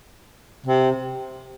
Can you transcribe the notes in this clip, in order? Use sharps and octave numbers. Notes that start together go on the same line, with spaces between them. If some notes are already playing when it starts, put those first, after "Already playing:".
C3